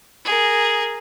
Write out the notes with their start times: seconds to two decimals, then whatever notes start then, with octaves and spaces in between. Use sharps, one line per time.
0.25 G#4 A#4